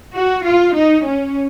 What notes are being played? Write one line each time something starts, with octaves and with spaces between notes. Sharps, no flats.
F#4
F4
D#4
C#4